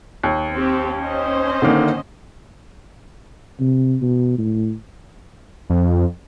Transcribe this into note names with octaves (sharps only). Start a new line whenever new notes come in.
D#2
C4 G4
C#4 C5 D#5
D3 D#3 A#3
C3
B2
A2
F2